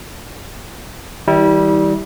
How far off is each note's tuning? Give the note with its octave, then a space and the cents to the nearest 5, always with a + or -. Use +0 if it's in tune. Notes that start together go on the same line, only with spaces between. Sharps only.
D#3 +40 G3 -10 E4 -40